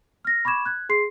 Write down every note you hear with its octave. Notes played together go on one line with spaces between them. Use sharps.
F6 A#6
B5 C#6 D6 G#6 E7
F#6 G#6
G#4 C6 C7